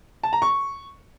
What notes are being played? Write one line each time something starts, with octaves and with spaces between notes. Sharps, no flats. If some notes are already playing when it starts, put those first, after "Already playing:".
A5
A#5
C#6